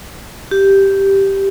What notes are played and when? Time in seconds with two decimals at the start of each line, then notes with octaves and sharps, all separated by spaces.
0.51 G4